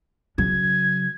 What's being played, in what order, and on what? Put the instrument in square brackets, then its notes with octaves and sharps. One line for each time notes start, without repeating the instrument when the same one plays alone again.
[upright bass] C#3 F#3 [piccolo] G#6